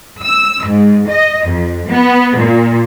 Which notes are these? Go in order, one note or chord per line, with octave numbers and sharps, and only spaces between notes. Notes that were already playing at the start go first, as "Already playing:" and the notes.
E6
G#2
D#5
F2
B3
A#2